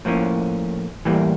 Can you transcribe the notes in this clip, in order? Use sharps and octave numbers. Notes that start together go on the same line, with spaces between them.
A2 F3 A#3 C#4
A2 E3 G3 A#3